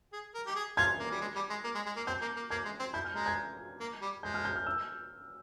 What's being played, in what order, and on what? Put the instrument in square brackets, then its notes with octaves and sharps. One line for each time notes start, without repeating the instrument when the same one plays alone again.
[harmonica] G#4
A#4
G4
G#4
[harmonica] F4 [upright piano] G#6
[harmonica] A#3
G3
G#3
G3
G#3
A#3
G#3
G#3
A#3
[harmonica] C4 [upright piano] G6
[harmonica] A#3
A#3
[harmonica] A#3 [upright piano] G#6
[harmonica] G#3
C4
[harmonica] E4 [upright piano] G6
[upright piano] F6
[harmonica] G#3 [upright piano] A#5
[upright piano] G#6
[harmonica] A#3
G3
[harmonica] G#3 [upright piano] G6
[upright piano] F6
G6
F6
E6